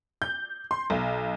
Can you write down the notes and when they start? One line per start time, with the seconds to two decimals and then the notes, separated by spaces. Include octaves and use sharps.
0.22 G6
0.71 C6
0.90 B1